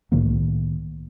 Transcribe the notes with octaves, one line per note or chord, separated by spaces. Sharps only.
C2 A2 D#3 A#3